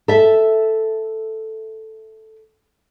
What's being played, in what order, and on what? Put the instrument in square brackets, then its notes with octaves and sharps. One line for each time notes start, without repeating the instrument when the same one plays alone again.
[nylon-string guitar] A4 E5